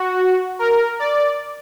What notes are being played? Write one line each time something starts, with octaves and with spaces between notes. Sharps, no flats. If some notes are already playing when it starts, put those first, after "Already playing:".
Already playing: F#4
A#4
D5